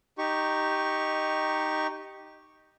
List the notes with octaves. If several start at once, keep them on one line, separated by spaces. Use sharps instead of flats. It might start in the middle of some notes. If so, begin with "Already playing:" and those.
D#4 G4 C#6